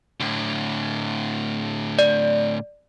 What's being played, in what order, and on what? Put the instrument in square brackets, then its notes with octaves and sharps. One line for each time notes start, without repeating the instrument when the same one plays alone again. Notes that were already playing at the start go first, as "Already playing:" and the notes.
[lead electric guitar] A2 D3
[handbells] D5